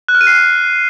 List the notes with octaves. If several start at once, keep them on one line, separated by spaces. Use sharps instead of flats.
F#6
F6
D#7
C7